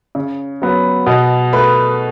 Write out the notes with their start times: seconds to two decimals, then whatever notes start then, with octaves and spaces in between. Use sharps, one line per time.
0.15 C#3
0.62 F#3 B3
1.06 B2 D#5
1.53 A3 B4